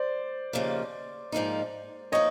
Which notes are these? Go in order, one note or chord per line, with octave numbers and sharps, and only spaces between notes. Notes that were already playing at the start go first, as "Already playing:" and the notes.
Already playing: C5 D5
D#2 C#3 F3 A#3
G#2 F3 A#3 D#4
F3 A#3 D#4 C#5 D#5